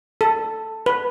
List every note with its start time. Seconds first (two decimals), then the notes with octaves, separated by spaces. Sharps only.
0.21 A4
0.86 B4